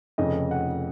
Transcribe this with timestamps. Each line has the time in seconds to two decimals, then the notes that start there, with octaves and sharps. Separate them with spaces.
0.18 F1 F2 C#3 D#5
0.51 F#5